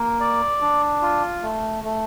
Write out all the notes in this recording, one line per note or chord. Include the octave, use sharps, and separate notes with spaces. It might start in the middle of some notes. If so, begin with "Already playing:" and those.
Already playing: A#3
D5
D4
F4
A3
A3